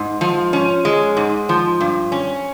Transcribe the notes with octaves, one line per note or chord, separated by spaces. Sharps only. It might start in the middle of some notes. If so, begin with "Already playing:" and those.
Already playing: G#2
F3
C#4
G#3
G#2
F3
G2
C#4